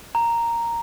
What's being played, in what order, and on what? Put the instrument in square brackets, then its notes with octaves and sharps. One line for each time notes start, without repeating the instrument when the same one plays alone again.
[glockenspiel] A#5